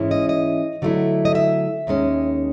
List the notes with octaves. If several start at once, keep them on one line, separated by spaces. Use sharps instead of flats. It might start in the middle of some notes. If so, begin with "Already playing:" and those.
Already playing: G#2 E3 G#3 C#4 E4
D#5
D#5
D3 F#3 A3 C#4 E4
D#5
E5
D#2 D#3 G#3 C#4